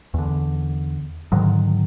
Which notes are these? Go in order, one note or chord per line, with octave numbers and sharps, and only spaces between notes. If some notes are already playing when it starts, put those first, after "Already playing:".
E2 D3
G#2 D3 D#3 F#3